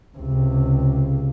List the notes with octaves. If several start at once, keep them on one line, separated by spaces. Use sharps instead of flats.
C#2 C3